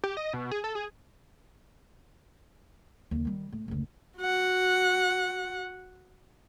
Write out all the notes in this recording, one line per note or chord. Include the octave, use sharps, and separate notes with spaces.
G4
D#5
B2
G#4
A4
G#4
D#2 D3
D#3 G3
A2
F#1 D2
F#4 F#5